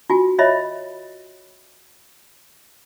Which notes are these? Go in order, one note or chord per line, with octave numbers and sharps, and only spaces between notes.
F4 F#4 G#5
F4 C#5 D#5 E5 B5